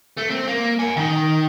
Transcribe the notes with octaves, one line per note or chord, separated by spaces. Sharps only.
A3
C4
A#3
F#5 G#5
D#3 D#4